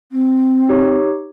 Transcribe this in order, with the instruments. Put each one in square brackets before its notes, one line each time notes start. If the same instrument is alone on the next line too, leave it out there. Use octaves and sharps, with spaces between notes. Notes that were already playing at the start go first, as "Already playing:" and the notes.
[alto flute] C4
[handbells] D#4 G4 C#5